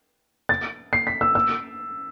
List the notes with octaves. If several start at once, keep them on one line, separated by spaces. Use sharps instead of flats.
A6
C7
B6
E6
E6